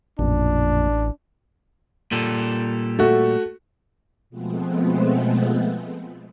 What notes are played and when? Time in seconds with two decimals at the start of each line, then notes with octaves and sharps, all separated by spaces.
0.19 A1 F2 A#2 D4
2.12 A#2 G3 A4
2.99 A3 F#4
4.30 B2 F3 G#3 A3 B3 C4